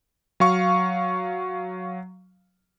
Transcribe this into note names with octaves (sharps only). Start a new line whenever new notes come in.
F#3 F5 C#6